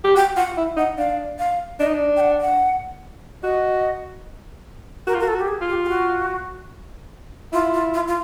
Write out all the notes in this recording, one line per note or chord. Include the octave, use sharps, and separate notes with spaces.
G4
F#4 G5
F4 F#5
E4
D#4 F#5
D4 F5
F5
D4 D#5
D#4
D4
G5
F#5
F#5
F#4 D#5
F#4 A#4
F4
F#4 A#4
A4
F#4
G4
G#4
F4
G4
G4
F#4
E4 F4
F4
F4
F4